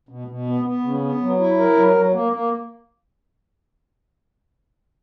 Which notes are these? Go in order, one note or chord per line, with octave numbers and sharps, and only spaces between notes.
B2
B2
B3
B3
C#3
B3
F#3
E4
A#4
F#3
F#3
A#3
A#3